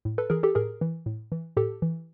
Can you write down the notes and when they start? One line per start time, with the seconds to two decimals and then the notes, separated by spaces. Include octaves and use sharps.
0.05 A2
0.18 A4 B4
0.30 E3 G#4 A#4
0.43 G4 A4
0.55 A2 G#4 A#4
0.81 E3
1.06 A2
1.32 E3
1.57 A2 G4 A4
1.82 E3